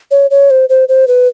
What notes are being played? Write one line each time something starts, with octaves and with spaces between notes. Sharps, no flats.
C#5
C#5
C5
C5
C5
B4